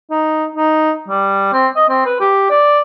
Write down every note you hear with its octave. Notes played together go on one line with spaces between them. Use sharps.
D#4
D#4
G3
C4
D#5
C4
B4
G4
D5